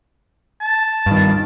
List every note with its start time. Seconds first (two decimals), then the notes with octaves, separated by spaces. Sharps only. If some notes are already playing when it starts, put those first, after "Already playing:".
0.61 A5
1.06 G2 D#3